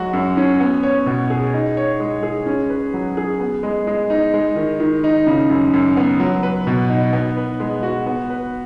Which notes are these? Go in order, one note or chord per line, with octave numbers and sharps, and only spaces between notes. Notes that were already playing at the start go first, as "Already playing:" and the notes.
Already playing: F#3 G#3 F#4
F#2
C#4
B3
C#5
B2
G#4
D#4
C#5
G#3
G#4
C#4
B4
F#3
G#4
B3
G#3
G#3
D#4
G#3
D#3
D#3
D#4
C#3
F#2
F#2
B3
F#3
B4
B2
D#4
B3
B4
G#3
F#4
B3
B4